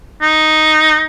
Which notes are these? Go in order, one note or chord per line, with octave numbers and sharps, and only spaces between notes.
D#4